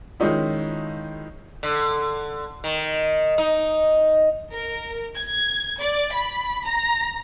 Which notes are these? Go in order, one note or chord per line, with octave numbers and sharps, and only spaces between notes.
D#3 F3 G#3 C#4 D#4 E4
D3
D#3
D#4
A#4
G#6
D5
B5
A#5